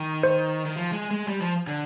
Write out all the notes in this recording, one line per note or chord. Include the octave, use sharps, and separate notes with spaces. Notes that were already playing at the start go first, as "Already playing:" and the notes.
Already playing: D#3
C5
D#3
F3
G#3
G#3
G3
F3
D3